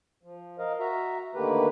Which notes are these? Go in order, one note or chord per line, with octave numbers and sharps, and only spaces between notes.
F3
A#4 D#5 F5
F#4 E5 A#5
D3 D#3 A3 A#3 G4 B4